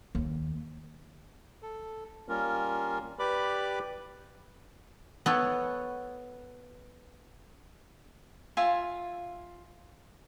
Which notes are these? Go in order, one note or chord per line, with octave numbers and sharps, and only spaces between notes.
D#2
A4
G3 A#3 C#4 F4 A#4
G4 B4 D5 B5 D6
B3 A4 C#5 G5
F4 E5 G#5